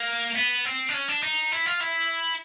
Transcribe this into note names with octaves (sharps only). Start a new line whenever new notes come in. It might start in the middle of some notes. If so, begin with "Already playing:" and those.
Already playing: A#3
B3
C4
D4
C#4
D4
D#4
E4
F4
E4